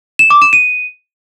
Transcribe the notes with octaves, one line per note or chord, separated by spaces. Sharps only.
E7
D6
E7
D#7